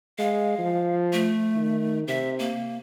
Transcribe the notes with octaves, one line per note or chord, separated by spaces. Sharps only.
G#3 F5
F3
A3
D#3
C3 E5
A#3